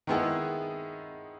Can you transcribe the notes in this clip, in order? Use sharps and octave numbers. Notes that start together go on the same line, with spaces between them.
D#3 G#3 B3 E4 G#4